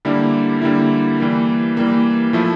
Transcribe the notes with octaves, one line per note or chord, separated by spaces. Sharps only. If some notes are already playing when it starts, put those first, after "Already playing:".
D3 G3 A#3 E4
D3 G3 A#3 E4
E3 G3 A#3
E3 G3 A#3
F3 A3 E4